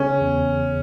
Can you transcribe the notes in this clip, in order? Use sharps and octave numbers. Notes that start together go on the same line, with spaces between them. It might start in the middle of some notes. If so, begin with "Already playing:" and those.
Already playing: C#3 C#4
E2